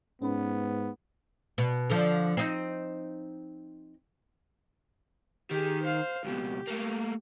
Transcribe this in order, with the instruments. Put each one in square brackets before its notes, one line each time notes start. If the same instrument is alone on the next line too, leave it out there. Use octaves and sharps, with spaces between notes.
[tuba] G#2 [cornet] B3 [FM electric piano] C#4 B4
[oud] B2
D3 F3
C4 D#4
[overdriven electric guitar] D#3 [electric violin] G4 G#4
[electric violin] C5 F5
[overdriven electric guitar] C#2 B2 [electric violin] G4
[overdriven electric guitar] A3 A#3